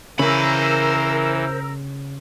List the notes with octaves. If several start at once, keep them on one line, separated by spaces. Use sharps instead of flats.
C#3 E3 A#4 C5 B5 E6